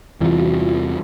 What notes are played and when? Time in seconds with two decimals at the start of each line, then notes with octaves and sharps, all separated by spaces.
0.20 E2 C3 E3 G3 F4
0.39 F#4
0.59 F4